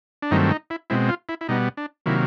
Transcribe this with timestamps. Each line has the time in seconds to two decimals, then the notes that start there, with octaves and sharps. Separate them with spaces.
0.22 D4
0.31 G2 D#3 F#3 A3 C4 D#4
0.51 D#4
0.70 E4
0.90 B2 G#3 C4 E4
1.09 F4
1.29 E4
1.41 E4
1.49 B2 G3 B3 D#4
1.77 D4
2.06 C3 D#3 F#3 A#3 E4